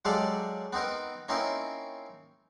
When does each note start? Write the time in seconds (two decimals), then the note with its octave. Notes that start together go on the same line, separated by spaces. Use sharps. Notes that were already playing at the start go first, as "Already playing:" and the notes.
0.05 F#3 G#3 G4 A4 D5 F5
0.73 B3 C4 D#4 A#4
1.28 A#3 C4 C#4 D#4 E4 A#4